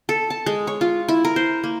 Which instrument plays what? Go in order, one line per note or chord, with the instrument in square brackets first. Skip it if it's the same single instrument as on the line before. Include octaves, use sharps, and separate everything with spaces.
[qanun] A4
A5
G#3
C#5
F4
E4
A#4
C5
A#3